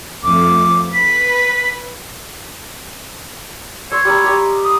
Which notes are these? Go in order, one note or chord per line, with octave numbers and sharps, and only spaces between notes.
F2 F3 A3 D6
B4 B6
C#5 C6 E6
G3 A#5
G4 D#5
D#6